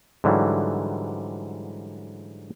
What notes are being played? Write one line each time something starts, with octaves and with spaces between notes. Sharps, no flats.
G#2 D3 E3 F#3 G3